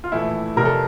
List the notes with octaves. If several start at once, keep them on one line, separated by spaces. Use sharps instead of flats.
F4
A#1 A2 E3 A3 E4
F1 F2 C3 A#4
A4